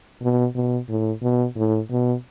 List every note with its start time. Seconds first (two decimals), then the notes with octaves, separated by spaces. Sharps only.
0.22 B2
0.55 B2
0.88 A2
1.22 B2
1.56 A2
1.90 B2